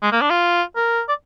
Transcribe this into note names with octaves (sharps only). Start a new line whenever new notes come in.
G#3
A#3
D4
F4
A#4
D5